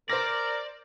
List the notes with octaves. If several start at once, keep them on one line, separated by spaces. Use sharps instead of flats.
A#4 C5 D5 A#6